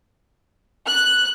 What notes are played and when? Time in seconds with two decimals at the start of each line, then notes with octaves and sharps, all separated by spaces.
0.86 F#6